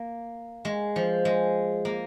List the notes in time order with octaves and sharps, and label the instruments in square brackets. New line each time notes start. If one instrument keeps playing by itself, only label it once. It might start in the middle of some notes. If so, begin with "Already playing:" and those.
Already playing: [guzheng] A#3
G#3
F3
G#3
A#3